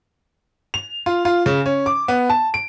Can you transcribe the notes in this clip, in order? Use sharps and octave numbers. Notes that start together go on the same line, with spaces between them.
F7
F4
F4
C#3
C#4
D6
B3
A5
D7